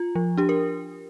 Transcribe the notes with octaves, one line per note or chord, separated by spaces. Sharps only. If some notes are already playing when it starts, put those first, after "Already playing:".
Already playing: F4
F3
D4 G4
A#4